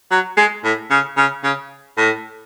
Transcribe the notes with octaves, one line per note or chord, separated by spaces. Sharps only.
F#3
G#3
A2
C#3
C#3
C#3
A2